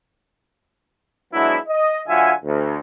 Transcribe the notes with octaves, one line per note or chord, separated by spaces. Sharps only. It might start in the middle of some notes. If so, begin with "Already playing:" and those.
F#3 G#3 B3 D4 E4
D#5
D3 F#3 F4 E5 F#5 G#5
D2